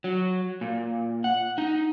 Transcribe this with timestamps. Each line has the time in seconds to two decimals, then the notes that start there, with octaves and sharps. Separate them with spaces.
0.04 F#3
0.61 A#2
1.24 F#5
1.58 D#4